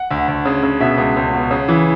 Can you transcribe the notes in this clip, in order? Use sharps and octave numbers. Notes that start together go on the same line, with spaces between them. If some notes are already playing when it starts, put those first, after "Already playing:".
Already playing: F#5
D2
D2
C#3
C#3
B2 E5
C#2
C#2
B2
C#3
E3